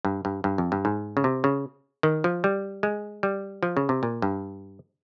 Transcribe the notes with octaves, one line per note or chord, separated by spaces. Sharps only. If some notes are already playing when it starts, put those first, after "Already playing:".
G2
G2
G2
F2
G2
G#2
C#3
C3
C#3
D#3
F3
G3
G#3
G3
F3
C#3
C3
A#2
G2